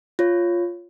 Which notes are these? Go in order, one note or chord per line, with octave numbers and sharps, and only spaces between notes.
F4 C#5